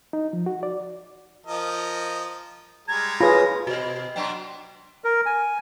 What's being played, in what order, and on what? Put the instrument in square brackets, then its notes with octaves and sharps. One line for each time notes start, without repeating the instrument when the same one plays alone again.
[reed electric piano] D#4
F3
F#4
D5
[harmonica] F3 A#4 D#5
[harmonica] G3 G#3 A#5 [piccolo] G#6
[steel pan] F4 G#4 [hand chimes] B4 C#5 B5 [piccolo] A#6
[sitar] B2 [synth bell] F#4 D#5
[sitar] B2 F#3 D4 [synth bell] G5 C6
[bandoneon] A#4
G#5